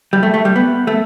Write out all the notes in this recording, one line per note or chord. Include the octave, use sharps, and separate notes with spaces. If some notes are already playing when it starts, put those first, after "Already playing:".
G3
A3
A3
G3
B3
A3